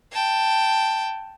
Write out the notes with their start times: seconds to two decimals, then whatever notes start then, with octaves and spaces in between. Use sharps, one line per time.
0.12 G5 A5